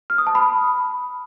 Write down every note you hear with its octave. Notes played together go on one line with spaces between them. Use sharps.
F6
D#6
A5
B5